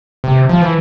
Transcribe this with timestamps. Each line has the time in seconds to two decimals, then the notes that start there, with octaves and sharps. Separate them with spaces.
0.24 C3
0.49 F3
0.62 E3